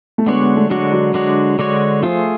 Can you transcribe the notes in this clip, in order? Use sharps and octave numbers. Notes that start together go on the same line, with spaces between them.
A3
D3 G#3 B3 D4 F#4 C#5
B3
A3
D3 F#3 G#3 D4 F#4 C#5
F#3
D3 G#3 D4 F#4 C#5
D3 G#3 D4 F#4 C#5
F3 A3 F4 G#4